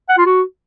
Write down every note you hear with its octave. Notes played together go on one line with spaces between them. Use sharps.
F#5
F4
F#4